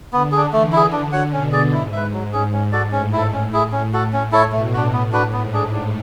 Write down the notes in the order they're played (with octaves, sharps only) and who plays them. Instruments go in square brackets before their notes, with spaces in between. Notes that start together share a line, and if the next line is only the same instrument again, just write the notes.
[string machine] D3 [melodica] B3
[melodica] D4 G#4
[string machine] E3 [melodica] A3
[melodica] E4 G#4
[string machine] D3 [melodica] D4
[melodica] F#4 C#5 F#5
[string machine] B2 [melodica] C#4
[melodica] G#4 D5
[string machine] G#2 [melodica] E4
[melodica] B4 E5
[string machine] G#2 [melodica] F#3
[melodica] C#4 G#4
[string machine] G#2 [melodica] C#4
[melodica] F#4 A4 D5
[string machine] A2 [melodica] C#4
[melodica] E4 A4
[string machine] A2 [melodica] C#4
[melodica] E4 G#4
[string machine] A2 [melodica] C#4
[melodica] F#4 A4
[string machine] A2 [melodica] C#4
[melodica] E4 A4 C#5
[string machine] B2 [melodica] A3
[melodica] D4 F#4
[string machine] A2 [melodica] B3
[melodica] D4 F#4 B4
[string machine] G#2 [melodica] B3
[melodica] D4 G#4
D4